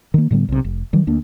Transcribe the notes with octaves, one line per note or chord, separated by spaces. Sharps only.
D#3 A#3
A2 D3 G3 B3
B1 C3
F1
D#3 F#3 G3
D2 A#3 D4